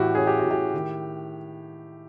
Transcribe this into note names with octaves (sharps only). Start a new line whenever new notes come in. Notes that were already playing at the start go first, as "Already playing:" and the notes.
Already playing: A2 E3 F#4 G4
C#4 G#4
G4
A2 F#4
G4
D#3